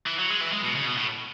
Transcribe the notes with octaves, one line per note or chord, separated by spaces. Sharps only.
E3
F#3
G#3
E3
G#3
B2
C#3
B2
A2